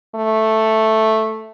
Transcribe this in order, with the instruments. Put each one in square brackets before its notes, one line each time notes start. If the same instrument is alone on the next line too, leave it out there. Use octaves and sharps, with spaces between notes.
[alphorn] A3